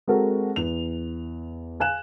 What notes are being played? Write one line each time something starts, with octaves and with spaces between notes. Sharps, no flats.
G#3 C4 F#4 A4 A#4
E2 F7
F5 G#5 F#6 E7